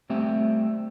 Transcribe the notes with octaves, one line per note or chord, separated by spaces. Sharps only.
G3 A3 C4 G4 E5